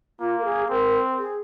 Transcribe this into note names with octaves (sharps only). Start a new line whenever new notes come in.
A#3 F4
A#4
G#4
C4 A#4
G#4